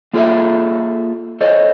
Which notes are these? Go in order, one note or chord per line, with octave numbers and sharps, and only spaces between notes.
A#3 F4 G#4 A4 D#5 E5
A4 C5 C#5 D#5